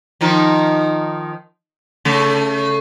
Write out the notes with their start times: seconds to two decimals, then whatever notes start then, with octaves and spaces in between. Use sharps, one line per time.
0.21 D#3 F3 D#4
2.05 C#3 A3